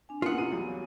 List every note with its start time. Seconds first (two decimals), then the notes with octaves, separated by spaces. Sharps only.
0.09 C4 D4 G#5
0.22 A#3 B3 C#4 E4 F4 F#5 D#6
0.38 F1 C3 D#7
0.52 E2 F#3 G3 C#5 F5 G#5